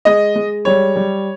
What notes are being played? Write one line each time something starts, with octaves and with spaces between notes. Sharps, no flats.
G#3 D#5
G#3
G3 C#5
G3